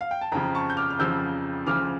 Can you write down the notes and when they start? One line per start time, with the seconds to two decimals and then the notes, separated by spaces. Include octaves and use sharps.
0.01 F5
0.11 G5
0.21 A5
0.32 F2 C#3 F3 G5 A#5
0.55 A5 C#6
0.70 G6
0.77 D6 F6
0.90 F6
0.99 F2 C#3 F3 E6 G6
1.66 D2 C#3 F3 D6 F6